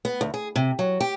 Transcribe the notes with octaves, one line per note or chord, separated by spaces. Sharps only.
B3
D2
G#4
C3
F#3
G4